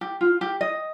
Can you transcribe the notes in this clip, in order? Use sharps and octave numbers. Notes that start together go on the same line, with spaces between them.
G4
F4
G4
D#5